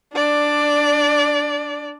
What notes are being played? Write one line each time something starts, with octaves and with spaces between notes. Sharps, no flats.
D4 D5